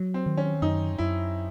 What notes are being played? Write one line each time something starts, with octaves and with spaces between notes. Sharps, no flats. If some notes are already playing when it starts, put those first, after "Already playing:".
Already playing: F#3
C4
D#3
C#4
F#2 D#4
F#2 E4